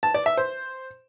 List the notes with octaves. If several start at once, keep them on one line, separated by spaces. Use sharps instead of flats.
A5
D5
E5
C5